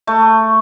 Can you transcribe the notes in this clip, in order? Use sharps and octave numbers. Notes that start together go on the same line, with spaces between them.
A3